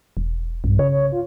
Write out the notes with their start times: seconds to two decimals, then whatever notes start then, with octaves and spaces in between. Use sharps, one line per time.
0.17 E1
0.64 B1 G2
0.79 C#3 C#5
0.92 C#5
1.12 F4